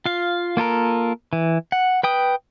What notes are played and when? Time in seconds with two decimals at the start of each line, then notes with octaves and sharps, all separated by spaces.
0.06 F4 F5
0.57 A#3 F4 A4 A#4
1.33 E3
1.72 F#5
2.03 B4 G5 D#6